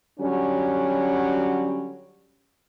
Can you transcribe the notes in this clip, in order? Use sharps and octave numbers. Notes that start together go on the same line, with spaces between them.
D3 F#3 G3 C#4